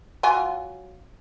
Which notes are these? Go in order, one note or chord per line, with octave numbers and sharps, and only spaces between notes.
F#3 F4 G#5